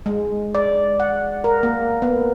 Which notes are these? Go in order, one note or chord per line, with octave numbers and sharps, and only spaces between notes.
G#3
D5
F#5
A#4
A#3
B3